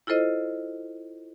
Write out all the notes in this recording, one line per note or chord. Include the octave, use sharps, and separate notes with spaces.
E4 F4 A4 C5 D#5